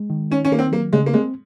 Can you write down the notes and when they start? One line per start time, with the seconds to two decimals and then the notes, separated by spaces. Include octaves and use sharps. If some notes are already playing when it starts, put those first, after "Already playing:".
Already playing: G#3
0.10 D#3
0.31 C#4 D#4
0.45 C#4
0.52 D#3 A#3
0.59 C4
0.72 F#3 A#3
0.93 C#3 G#3
1.06 A#3
1.13 G#3 C4